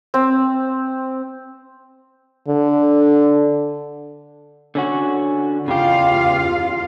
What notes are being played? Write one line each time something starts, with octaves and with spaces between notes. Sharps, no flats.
C4
D3
D3 C#4 F#4
E2 C#3 F4 G4 F5